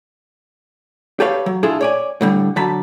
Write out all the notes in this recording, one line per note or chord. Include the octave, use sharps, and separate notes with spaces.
G4 A4 B4 C#5 F5
F#3
D4 E4 F4 G#4 A4
C#5 D5 G#5
A2 D3 G3
D3 F#3 A5 B5